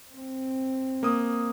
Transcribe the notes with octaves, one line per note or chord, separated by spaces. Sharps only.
C4
A#3 D#6